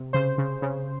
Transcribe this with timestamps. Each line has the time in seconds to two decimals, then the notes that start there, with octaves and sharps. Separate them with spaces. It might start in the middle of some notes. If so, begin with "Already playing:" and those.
Already playing: C3
0.13 C#3 C5
0.38 C#3
0.62 C#3